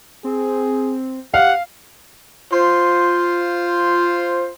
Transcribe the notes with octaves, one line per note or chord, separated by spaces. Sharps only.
C4 G#4
G4 F5 F#5
F4 C5